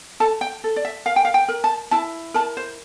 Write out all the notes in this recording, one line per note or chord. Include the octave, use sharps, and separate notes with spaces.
A4 A5
G5
A4
D5
E5
A#4 F5
G5
F5
G5
A#4
A5
E4 A5
A#4 A5
C5